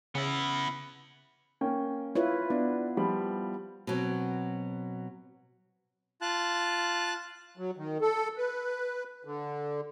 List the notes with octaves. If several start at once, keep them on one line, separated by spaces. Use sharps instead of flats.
C#3 B3 E4
A#3 C#4 G5
E4 F4 B4 C#5
B3 D4
F3 G3 B5
B2 F#3 C4
F4 A5 F#6
F#3
D#3
A4
B4
D3